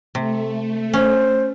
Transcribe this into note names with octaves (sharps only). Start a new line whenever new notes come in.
C3 A3
C#4 C5